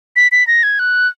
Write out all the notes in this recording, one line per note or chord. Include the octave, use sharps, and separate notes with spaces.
B6
B6
A#6
G#6
F#6